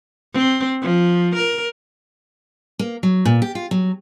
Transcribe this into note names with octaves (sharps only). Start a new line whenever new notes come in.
C4
F3
A#4
A#3
F#3
A#2
G4
F4
F#3